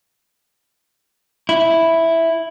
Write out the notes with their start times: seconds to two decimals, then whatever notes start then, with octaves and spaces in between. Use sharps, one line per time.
1.49 E4